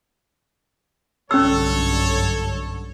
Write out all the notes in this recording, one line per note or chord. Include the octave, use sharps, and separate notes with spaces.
B1 G2 D3 C#4 A4 C#5 E6